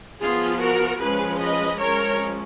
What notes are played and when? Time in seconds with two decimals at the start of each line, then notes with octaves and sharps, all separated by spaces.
0.21 F3 B3 F4 G#4
0.61 F#4 A#4
1.01 F3 G#3 C#4 G#4 B4
1.41 B4 D#5
1.80 F3 G#3 C#4 A#4 C#5